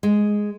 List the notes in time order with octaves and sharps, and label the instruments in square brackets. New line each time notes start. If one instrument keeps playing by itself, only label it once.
[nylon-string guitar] G#3